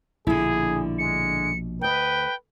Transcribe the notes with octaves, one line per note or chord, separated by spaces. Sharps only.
A#1 B2 D3 E4 G#4
G#3 C#7
D2 B4 D#5 G5